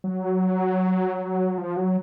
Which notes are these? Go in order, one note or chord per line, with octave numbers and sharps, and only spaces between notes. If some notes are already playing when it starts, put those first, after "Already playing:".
F#3
F3
F#3